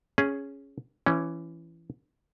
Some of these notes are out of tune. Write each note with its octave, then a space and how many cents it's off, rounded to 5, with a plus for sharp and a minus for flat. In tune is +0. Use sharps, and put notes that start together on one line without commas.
C#4 +0 G#4 +0
E3 +15 C#4 +0